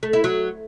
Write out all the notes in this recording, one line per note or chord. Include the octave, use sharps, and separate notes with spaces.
A3
E4
F#3